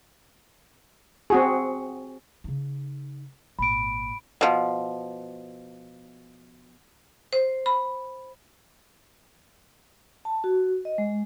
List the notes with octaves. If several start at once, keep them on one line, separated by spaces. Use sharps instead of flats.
C4 F#4 G#4
C#3 D#4
G#1 A#2 B5 D7
B2 F3
C5
B5
A5
F#4
D#5
G#3